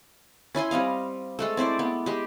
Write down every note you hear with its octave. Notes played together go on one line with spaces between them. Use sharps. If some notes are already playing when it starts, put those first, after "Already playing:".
C#4 E4 G#5 C6
G3 C4 D#5 F5
G#3 A3 A4
C4 E4 C5 D5
B3
G#3 G4